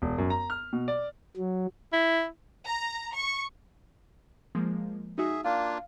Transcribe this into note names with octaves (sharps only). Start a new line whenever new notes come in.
E1
F#2
A#5
F6
B2
D5
F#3
E4
A#5
C#6
F3 G#3 A#3
D#4 F#4 G#4 E5
A#3 D4 F4 F5